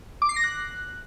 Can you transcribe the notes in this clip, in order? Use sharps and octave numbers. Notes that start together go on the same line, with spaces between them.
D6
C7
A#6
F#6